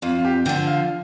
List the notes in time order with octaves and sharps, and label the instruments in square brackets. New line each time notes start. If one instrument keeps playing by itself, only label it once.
[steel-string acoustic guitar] F2 [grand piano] F4
[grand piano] F4
G4
[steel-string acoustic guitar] D3 [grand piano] G5
[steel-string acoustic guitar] F3
[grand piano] F5